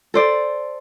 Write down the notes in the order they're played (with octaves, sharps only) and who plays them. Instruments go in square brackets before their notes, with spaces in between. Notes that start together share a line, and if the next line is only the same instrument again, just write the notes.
[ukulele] A4 C5 D5